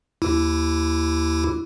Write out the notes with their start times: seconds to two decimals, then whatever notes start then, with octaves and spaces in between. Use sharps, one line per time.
0.22 D#2 E4